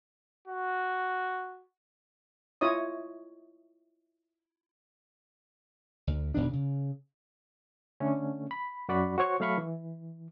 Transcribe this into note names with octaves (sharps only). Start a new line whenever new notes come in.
F#4
E4 F4 C#5 D#5 D#6
D2
E1 B2 D#3 D4
C#3
D3 A3 C#4
B5
F#2 F#4 D5 B5
F#4 C5 C#5 C#6
F#3 A3 F5 B5 C#6
E3